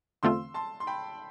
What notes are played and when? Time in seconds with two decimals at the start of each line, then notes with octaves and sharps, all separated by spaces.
0.23 E2 D3 A3 C4 F4 C6 E6
0.54 A5 C6
0.80 C6
0.87 G5 B5